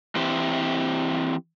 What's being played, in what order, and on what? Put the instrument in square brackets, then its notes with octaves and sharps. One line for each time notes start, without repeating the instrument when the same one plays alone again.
[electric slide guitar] E3 C4 G4